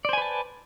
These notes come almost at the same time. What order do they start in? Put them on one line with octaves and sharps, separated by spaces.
D5 C5 G#5 B4 A5